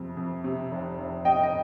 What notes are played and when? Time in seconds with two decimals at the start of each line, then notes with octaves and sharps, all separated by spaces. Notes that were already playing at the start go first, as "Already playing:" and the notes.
Already playing: F2 C3
0.17 F2
0.44 C3
0.71 F1
0.98 F1
1.25 C3 D#5 G5
1.43 D#5